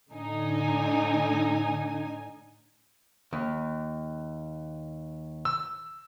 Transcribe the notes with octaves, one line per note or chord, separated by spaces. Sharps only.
A2 D3 D#4 G#5
D#2
E6